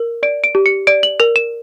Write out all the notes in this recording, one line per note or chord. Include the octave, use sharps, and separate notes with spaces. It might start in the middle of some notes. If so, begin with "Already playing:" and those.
Already playing: A#4
D5 D7
D7
G4
C#7
D5 D7
F#7
A#4 F7
E7